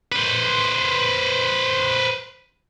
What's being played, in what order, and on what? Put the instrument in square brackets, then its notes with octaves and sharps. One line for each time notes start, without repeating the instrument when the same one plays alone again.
[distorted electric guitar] B4 C5